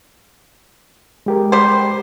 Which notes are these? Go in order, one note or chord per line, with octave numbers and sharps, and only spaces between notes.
G#3 G4 A#4
G3 C5